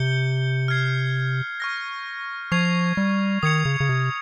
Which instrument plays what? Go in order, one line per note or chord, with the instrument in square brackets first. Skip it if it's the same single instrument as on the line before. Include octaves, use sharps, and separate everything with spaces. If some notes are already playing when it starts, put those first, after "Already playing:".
Already playing: [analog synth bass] C3 [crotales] G6 C#7 G7
[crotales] F6 G#6 C7
C#6 F6 A#6
[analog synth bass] F3 [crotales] C#6 G#6 C7 F7
[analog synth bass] G3
[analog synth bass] D#3 [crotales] D#6 G#6 C#7 F7
[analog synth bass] C#3
C#3
C3